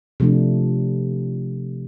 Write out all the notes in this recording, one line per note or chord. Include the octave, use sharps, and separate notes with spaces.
C3 F3 A3 D4